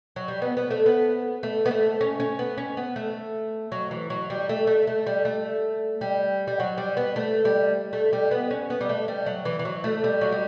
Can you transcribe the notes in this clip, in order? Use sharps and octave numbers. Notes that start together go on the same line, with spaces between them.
F#3
G3
B3
B3
A3
B3
A3
B3
A3
C#4
C#4
B3
C#4
B3
A3
F#3
E3
F#3
G3
A3
A3
A3
G3
A3
G3
G3
F#3
G3
B3
A3
G3
A3
G3
B3
C#4
B3
G3
A3
G3
F#3
E3
E3
F#3
A3
G3
F#3
G3